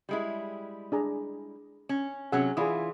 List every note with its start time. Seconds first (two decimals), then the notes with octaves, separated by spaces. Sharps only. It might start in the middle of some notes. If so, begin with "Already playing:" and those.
0.09 G3 G#3 E4
0.92 D4 G#4 A#5
1.89 C#4
2.32 C3 F#3 C#4 G#4 F#5 E6
2.57 E3 E4 F4 G#4 D5 D#6